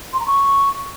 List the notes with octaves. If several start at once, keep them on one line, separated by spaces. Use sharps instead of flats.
C6
A#5
C#6